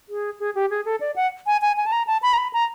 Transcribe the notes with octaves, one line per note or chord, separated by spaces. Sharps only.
G#4
G#4
G4
G#4
A4
D5
F#5
G#5
G#5
G#5
A5
A#5
A5
B5
A#5
B5
A#5